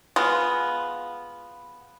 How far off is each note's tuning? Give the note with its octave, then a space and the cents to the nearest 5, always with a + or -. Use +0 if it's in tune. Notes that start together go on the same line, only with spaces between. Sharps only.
G#3 +0 B3 +0 F4 +0